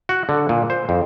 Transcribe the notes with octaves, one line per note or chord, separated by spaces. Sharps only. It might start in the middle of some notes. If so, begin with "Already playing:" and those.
F#4
D3
A#2
C5
F2